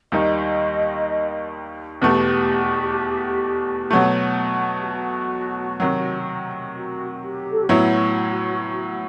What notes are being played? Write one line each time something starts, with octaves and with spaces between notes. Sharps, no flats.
D#2 D#3 G3 D#4 D#5
E2 B2 A3 G4
B2 F#3 A3
G4
F#4
C3 D#3 F#3
F#4
G4
A4
G4
A2 F#3 B3 E4 F#4